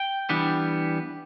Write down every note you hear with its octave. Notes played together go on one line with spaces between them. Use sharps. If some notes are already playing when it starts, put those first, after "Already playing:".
Already playing: G5
E3 G3 B3 D4